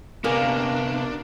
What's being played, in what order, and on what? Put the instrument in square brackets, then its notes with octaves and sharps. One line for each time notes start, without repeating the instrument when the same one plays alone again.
[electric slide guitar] C3 B3 [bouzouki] A#3 G4 G#4 [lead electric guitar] D4 [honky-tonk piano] A#4